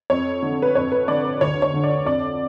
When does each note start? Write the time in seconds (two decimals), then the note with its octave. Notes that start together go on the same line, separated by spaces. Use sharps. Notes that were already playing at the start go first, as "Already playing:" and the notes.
0.10 F2 C#5
0.42 D3
0.62 B4
0.75 F2 C#5
0.92 B4
1.08 D3 D5
1.24 B4
1.41 D2 C#5
1.62 C#5
1.74 D3
1.84 D5
2.05 F2 D5